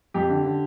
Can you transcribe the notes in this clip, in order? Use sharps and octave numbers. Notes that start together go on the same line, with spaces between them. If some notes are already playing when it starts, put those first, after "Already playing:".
F2 G4
D3
D3